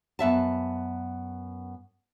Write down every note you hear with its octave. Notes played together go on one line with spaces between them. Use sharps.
F#2 B3 E5 A5